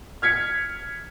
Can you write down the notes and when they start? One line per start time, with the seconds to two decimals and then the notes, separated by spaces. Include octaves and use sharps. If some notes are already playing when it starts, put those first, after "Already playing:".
0.22 F6 G#6 B6 C#7